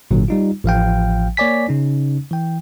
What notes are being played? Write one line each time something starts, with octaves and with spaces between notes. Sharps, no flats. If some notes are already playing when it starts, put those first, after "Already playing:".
G#1 A#2 D3 F#3
G3 D#4 F4
A1 F3 F5 G5
A#3 C#5 D5 G#5 B6
C#3 C#4 D#4
E3 G5